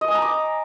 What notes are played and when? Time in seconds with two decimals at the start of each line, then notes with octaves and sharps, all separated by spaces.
0.01 D#5
0.08 G#5
0.15 A#5
0.22 D6